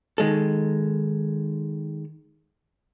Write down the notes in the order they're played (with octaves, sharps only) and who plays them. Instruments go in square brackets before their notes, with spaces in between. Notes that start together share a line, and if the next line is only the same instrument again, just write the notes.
[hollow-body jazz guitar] D#3 G#3 A4